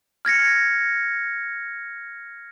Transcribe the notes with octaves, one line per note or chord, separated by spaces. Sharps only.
F6 G#6 A#6 C#7